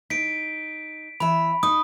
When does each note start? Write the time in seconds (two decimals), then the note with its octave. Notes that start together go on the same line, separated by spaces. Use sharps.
0.10 D#4 B6 D7
1.20 E3 E5 B5
1.63 D#4 D#6